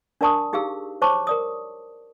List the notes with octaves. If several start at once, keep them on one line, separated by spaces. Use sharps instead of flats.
D4 A#4 D5 A5 C#6 D#6
D#4 G4 G#4 F5 E6
C5 C#5 A5 C#6 D6
A#4 D5 D#6